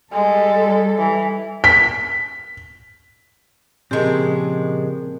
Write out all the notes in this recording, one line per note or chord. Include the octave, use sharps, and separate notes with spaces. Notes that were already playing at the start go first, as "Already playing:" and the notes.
G3 G#3 A4
E3
B6
A#2 C#3 F3 G#3 C4 D4 G4 A#4